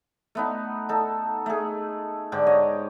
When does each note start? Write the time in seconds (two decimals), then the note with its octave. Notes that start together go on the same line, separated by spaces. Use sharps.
0.35 A3 B3 D#4
0.89 D#4 A4
1.46 A3 G#4
2.32 G#2 D3 G4
2.47 C#5 D#5